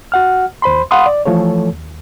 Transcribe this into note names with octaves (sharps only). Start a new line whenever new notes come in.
F#4 F#5 F6
D#2 C5 B5 C6
F5 F#5 B5 C6 D#6
D5
E3 F3 A3 A4 C#5
D#2